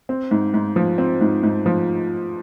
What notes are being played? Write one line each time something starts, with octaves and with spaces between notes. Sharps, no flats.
C4
G#2
G#2
F3
C4
G#2
G#2
F3